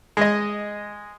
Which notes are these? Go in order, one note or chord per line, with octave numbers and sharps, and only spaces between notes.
G#3 D#5